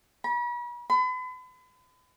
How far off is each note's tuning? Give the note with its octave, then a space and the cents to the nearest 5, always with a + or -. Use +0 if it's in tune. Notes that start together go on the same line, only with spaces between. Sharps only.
B5 -40
B5 +40